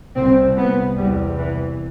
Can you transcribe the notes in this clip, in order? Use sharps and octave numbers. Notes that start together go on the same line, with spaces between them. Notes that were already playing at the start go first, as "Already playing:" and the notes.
C2 C4
C3
B3
E2 C3 G3
E3